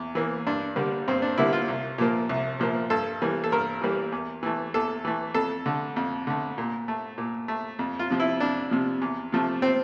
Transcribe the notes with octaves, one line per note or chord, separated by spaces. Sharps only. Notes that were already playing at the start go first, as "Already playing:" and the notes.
Already playing: E2
E3 A#3
G2 D4
D3 G3 A#3
G2 C4
D4
D3 G3 A#3 E4
F4
C2
A#2 F3 A#3
C2
A#2 F3 A#3
G2 A4
E3 G3 A#3
A4
G2 A#4
E3 G3 A#3
E2
E3 A3
E2 A4
E3 A3
F2 A4
D3 A3
F2
D3 A3
A#2
A3
A#2
A3
F2
F4
C3 F3
E4
F2 D4
C3 F3
E2
C3 F3 A3
C4